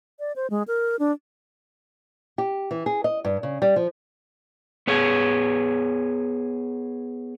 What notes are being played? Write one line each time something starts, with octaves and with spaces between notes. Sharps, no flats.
D5
C5
G#3
A#4
D4
G4
E3
G#4
D#5
G2
C#3
G3
F3
B3 G#4 C#5